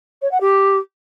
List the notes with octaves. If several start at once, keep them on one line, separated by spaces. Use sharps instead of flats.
C#5
F#5
G4